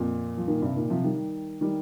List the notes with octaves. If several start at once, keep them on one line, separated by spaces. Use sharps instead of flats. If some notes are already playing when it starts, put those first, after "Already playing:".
Already playing: F2 A#2
F3
A#2 D#3
G2 C3
A#2 D#3
C3 F3
D#3 G3
D#3 G3